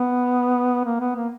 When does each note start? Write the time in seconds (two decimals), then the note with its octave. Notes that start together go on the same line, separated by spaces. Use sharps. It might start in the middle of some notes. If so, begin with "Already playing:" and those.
Already playing: B3
0.85 A#3
1.00 B3
1.16 A#3